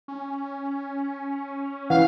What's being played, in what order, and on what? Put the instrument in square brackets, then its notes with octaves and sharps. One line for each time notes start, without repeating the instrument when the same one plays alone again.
[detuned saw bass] C#4
[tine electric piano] E3 [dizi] F5 [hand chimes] F#5